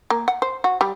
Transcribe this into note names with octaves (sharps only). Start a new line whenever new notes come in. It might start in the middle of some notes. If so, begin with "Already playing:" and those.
A#3
F#5
C5
F#4
G3